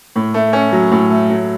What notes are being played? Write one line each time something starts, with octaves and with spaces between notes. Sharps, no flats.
A2
A3
C#4
F#3
A2
A3
F#3